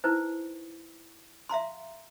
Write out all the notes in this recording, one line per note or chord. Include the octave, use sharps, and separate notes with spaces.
D#4 E4 B4 C5
E5 F5 A#5 C6